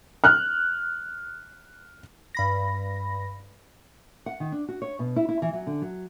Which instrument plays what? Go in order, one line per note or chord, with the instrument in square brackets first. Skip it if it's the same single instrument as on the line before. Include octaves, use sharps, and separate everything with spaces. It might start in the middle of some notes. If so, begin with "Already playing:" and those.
[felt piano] F6 F#6
[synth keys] G2 B5 A#6
[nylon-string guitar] F#5
D#3
D4
F#4
C#5
B2
E4
E4
E3
F#3
D3
F#3